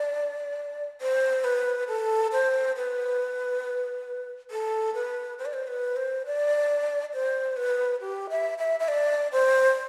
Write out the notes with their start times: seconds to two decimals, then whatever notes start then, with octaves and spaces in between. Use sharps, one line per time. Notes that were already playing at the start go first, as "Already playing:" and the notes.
Already playing: D5
1.01 C5
1.44 B4
1.88 A4
2.32 C5
2.76 B4
4.51 A4
4.94 B4
5.39 C5
5.46 D5
5.53 C5
5.67 B4
5.96 C5
6.26 D5
7.14 C5
7.57 B4
8.01 G4
8.30 E5
8.58 E5
8.80 E5
8.88 D5
9.32 C5